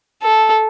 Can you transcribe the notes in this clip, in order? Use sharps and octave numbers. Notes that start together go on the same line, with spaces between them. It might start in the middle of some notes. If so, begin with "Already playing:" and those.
A4